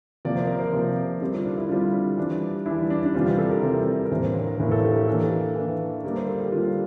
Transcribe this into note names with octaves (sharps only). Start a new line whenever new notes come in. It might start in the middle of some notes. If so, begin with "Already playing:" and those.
C3 F3 A#3 D5
C5
A#4
C5
C3 F3 A#3
D3 G3 C4 A#4
F4
D4
E4
D3 G3 C4 F4
E3 G3 D4
E3 G3 D4 E4
D4
D4
C3 E3 G3 C4 F4
G4
A4
A#4
C3 E3 G3 C4
A#4
A2 E3 A#3 D4 C5
C5
A#4
A#4
A2 E3 A#3 D4 C5
A4
G4
G4
E3 A#3 D4 A4
E3 A#3 D4
D3 G3 A#3 D4 A#4
C5
A4
G4
D3 G3 A#3 D4 F4